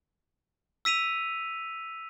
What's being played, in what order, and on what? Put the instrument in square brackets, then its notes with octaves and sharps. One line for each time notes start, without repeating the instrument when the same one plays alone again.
[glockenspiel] E6 B6 D#7 F7